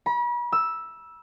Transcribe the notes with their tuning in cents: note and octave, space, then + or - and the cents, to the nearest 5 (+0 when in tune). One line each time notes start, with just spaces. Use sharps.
B5 -40
E6 +0